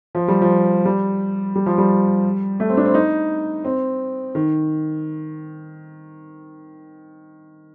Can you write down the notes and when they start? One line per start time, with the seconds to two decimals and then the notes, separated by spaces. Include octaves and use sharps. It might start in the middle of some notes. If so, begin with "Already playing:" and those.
0.15 F3
0.28 G3
0.42 F3
0.85 G3
1.56 G3
1.66 F3
1.78 G3
2.60 A3
2.69 C4
2.77 D4
2.85 C4
2.94 D#4
3.64 C4
4.35 D#3